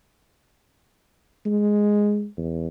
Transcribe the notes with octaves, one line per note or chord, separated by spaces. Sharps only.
G#3
E2